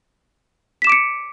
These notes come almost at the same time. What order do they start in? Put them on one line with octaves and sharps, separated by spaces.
B6 E7 D6 D7 C#7